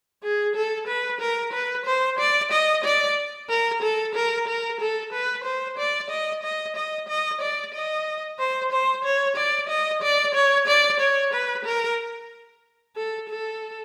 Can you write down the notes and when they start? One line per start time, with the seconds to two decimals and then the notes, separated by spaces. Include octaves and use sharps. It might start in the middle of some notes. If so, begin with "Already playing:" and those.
0.23 G#4
0.55 A4
0.88 B4
1.21 A#4
1.53 B4
1.86 C5
2.19 D5
2.52 D#5
2.84 D5
3.49 A#4
3.83 A4
4.15 A#4
4.48 A#4
4.80 A4
5.13 B4
5.45 C5
5.78 D5
6.10 D#5
6.43 D#5
6.76 D#5
7.09 D#5
7.41 D5
7.74 D#5
8.39 C5
8.72 C5
9.04 C#5
9.37 D5
9.69 D#5
10.02 D5
10.35 C#5
10.68 D5
11.00 C#5
11.33 B4
11.65 A#4
12.96 A4
13.29 A4